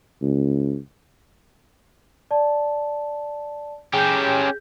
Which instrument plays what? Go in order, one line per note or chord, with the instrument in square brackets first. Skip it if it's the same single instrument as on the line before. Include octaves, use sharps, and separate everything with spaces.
[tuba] C#2
[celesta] D5 A5
[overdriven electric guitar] C#4 G4 [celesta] G#4 G6